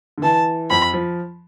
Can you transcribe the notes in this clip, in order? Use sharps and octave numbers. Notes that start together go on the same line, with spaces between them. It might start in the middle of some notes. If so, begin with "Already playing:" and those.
D3
E3 A5
F2 F3 B5
F3